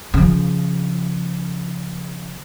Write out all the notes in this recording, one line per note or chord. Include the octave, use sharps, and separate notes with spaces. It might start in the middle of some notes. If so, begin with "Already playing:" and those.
C#3 F3